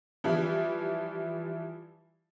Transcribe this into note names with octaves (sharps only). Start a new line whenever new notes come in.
E3 F3 G3 E4